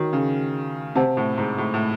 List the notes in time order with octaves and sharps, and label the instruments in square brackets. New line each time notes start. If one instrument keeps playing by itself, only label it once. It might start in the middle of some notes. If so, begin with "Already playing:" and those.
Already playing: [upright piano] D#3 [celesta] F#4 C#5
[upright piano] C#3
[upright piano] C3 [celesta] C5 F#5 A5
[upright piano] A2
G#2
A2
A2